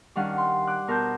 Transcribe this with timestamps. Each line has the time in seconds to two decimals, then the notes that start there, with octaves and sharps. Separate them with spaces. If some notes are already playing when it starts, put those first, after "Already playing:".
0.15 D#3 G3 C#4 D4 F5 F#5
0.38 C6
0.67 D6 F#6
0.87 B2 A#4 C5 A5 G6